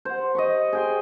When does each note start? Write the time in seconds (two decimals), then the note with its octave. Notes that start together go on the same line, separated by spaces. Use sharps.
0.05 C5 F#5
0.35 D#5 B5 C#6
0.73 G#4 G5 C6